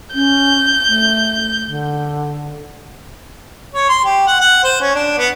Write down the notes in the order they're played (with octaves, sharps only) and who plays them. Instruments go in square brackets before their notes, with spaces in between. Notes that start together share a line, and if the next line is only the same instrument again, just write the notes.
[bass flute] C#4 [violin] G6
[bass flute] A3
D3
[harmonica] C#5
C6
G4
F#5
F#5
C5
C#4
D4
B3